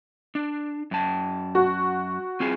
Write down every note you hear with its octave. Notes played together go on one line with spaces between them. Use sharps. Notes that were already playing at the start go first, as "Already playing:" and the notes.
D4
F#2 A5
F#4
C4 F4 G#4